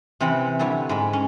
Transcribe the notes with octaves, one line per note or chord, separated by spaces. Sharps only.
C3 E3 C4 F#5 B5
D3 G3 E4 B4 C#5
G#2 G#3 B5
C#4